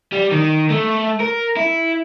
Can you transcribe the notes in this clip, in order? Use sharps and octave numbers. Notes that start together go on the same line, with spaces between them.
G3
D#3
A3
A#4
E4